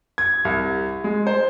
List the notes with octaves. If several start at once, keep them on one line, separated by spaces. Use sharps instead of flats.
G#6
C2
G#3
C5